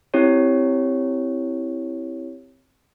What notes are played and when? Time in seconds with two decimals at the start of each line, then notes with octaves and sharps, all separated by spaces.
0.14 C4 E4 G4 C#5